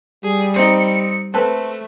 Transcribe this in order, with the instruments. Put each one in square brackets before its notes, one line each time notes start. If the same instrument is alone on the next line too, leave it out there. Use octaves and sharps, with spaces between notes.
[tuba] G3 [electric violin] G#4
[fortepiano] C4 D#4 [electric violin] C#7
[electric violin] A3 [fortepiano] C4 A4 B4